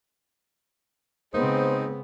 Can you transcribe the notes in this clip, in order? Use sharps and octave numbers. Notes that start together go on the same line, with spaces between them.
C#3 G#3 B3 C4 D#4 C5